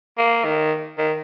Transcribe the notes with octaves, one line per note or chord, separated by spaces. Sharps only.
A#3
D#3
D#3